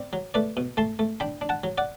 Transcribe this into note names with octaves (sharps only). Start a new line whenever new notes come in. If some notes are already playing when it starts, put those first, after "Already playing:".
Already playing: C4 D5
F#3
A3 B4 D5
B2
A3 A5 C6
A3
D4 G5 B5
D4
F#5 A5
F#3
D5 F#5